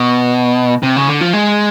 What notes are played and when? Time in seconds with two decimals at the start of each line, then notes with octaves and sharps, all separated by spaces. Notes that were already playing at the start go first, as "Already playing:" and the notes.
Already playing: B2
0.83 C3
0.96 C#3
1.08 D3
1.21 F3
1.33 G#3